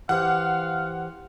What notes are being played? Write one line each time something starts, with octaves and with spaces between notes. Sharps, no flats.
E3 G4 C5 F5 F#5